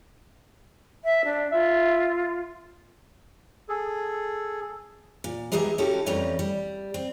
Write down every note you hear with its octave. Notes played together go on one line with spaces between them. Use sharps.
E5
D4
F4 E5
G#4 A4
A#2
G#3 B3 D#4 G4 G#4 E5
C#4 D#4 E4 F#4 G4 A4
F2 E3 G3 A3 C#4 D#4
G3
C4